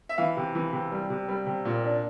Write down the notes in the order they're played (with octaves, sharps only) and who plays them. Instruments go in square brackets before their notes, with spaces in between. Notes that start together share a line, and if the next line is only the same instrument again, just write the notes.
[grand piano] E5
E3 F5
C3
E3
C3
G3
C3
G3
C3
A#2
D4